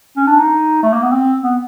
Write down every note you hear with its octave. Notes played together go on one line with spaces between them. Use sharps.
C#4
D4
D#4
A3
A#3
B3
C4
B3